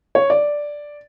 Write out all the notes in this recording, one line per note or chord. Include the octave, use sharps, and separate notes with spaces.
C#5
D5